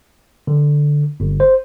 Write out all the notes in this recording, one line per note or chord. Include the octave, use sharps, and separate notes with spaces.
D3
G1
C5